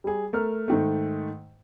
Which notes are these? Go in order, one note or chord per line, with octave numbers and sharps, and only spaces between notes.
G3 G#4
A3 A#4 F6
G#2 D#3 A3